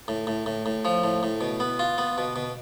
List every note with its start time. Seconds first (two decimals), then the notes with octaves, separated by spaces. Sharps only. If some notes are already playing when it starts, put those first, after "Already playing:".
0.08 A2
0.27 A2
0.46 A2
0.66 A2
0.85 F3
1.04 A2
1.23 A2
1.41 B2
1.60 B3
1.79 F4
1.98 B3
2.18 B2
2.36 B2